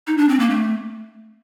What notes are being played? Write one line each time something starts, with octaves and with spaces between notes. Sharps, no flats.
D#4
D4
C4
A#3
A3